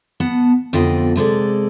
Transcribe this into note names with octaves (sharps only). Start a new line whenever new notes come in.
B3 F#5 A5
F2 D3 B3 F4 D#5 G5
C3 G#3 A4 D5